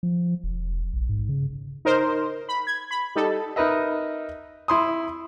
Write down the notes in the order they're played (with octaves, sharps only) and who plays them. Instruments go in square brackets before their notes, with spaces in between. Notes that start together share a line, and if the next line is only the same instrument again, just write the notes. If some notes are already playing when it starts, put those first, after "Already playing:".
[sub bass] F3
E1
A#1
G#2
C#3
[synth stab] D#4 A#4 C5
B5
G#6
B5
G3 D#4 A4
[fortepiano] D#4 A#4 B4 D#5 E5
E4 C6 D#6